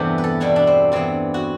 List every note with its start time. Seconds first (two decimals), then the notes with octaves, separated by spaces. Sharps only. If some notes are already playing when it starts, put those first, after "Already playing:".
Already playing: E2 G2 C3 E3 A3 B3 E4 G4
0.18 B4
0.24 A4
0.40 B2 G3 B3 E4
0.56 D4
0.67 C4
0.92 G2 E3 B3 C4
1.34 F#4